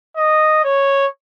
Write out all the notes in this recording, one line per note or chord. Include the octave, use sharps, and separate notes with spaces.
D#5
C#5